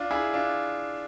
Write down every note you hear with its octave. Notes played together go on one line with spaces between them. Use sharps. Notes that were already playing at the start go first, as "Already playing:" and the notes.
Already playing: D4 F4
E4 G#4
D4 F4